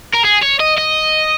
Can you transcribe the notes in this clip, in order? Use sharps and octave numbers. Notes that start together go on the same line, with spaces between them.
A#4
G#4
C#5
D#5
D#5